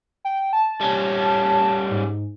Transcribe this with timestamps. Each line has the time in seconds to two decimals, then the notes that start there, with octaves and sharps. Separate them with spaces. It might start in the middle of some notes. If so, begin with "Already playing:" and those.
0.25 G5
0.53 A5
0.81 G3 C#4
1.17 A5
1.91 G#2